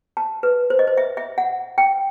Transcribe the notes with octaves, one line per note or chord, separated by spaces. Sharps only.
A5
B4
C5
D#5
C5
E5
E5
F#5
G5